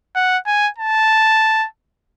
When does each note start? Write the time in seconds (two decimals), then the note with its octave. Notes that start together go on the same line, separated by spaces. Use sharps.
0.16 F#5
0.47 G#5
0.78 A5